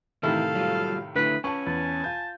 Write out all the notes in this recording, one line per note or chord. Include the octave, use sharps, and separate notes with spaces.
A2 C3 D#3 E3 E4 A4 F5
F#3 G3 F4
D3 A3 E4 B4
C#4 B4 G#5 A5 C#6
E2 A5
F4 G6